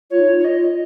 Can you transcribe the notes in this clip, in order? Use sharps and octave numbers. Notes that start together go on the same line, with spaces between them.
F4 C#5
D#4
F4
C#5
D#5